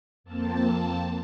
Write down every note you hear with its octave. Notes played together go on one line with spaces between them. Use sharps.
F2 A#3 C4 A5